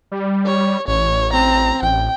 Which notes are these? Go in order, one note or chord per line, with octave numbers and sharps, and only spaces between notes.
G3
C#5
A1 C#5
C4 A#5
A1 G5